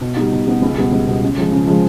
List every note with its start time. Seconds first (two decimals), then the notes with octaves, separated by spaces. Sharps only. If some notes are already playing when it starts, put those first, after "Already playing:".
0.01 B2
0.17 G3 B3 D#4
0.32 B2
0.47 G3 B3 D#4
0.62 C#2
0.78 B2 G3 B3
0.92 C#2
1.07 B2 G3 B3
1.22 C#3
1.38 F3 G#3
1.52 C#3
1.67 F3 G#3